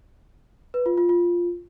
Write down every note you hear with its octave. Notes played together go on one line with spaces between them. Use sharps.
B4
F4
F4
F4